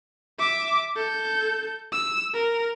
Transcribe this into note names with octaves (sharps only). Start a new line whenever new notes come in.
E5 D6
A4 G6
E6
A#4